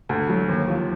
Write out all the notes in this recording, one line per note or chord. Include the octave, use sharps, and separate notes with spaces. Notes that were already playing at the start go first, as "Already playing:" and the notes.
D2
F#3
D#2
F3